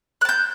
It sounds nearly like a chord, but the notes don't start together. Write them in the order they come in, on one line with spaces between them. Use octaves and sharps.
F#6 A5 G6